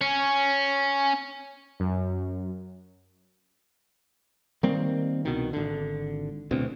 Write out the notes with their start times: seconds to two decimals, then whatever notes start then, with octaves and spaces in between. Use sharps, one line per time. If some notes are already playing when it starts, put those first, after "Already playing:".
0.01 C#4
1.80 F#2
4.63 D#3 G3 A#3 C4
5.25 C2 B2 D#3
5.53 G#1 D3
6.51 D1 D2 B2 C4